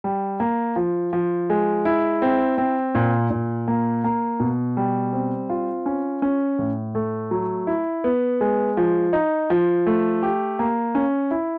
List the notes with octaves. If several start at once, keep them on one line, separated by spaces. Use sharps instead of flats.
G3
A#3
F3
F3
G#3
E4
C4
C4
A#2
A#2
A#3
A#3
B2
G3
C4
F4
C#4
C#4
A2
A3
F#3
E4
B3
G#3
F3
D#4
F3
A3
G4
A#3
C#4
E4